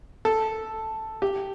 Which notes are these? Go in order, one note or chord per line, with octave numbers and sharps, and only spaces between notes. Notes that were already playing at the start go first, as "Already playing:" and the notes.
A4
G4